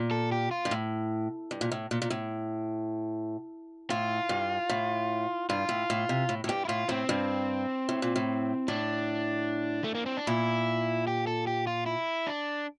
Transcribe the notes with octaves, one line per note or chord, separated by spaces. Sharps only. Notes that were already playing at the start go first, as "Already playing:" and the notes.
Already playing: A#2
A4
G4
F4
G2
A2
G2
A#2
A2
A#2
A#2
A2
A2 F4
G2
A2
G2 F4
A2
A2
C3
A2
A2
G2 G4
E4
A2 F4
A2 C4
G2
A2
A#2
A2
A2 D4
A3
A#3
C4
D4
A#2 E4
G4
A4
G4
F4
E4
D4